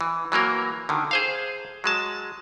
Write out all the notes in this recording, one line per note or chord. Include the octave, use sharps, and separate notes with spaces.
E3
E3 F#3 A#3 A#4
D3 D#3
G#4 C5 F5
F#3 G#3 A5